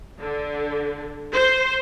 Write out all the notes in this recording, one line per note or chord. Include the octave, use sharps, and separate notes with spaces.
D3
C5